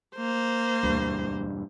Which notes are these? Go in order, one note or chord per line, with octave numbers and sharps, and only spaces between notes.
A#3 C5
E1 D2 G2